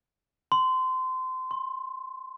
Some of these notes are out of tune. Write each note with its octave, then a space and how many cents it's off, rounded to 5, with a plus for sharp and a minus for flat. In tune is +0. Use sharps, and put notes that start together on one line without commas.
C6 -25
C6 +25